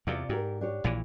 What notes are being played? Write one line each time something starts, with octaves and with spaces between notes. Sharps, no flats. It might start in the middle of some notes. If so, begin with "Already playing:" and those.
E2 C3 F4 D5
G#2 G4 A#4
D4 G4 C#5
A#1 A#2 E3